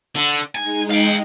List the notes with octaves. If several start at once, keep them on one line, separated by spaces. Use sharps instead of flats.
D3
G#3 D#4 G#5
F5 G5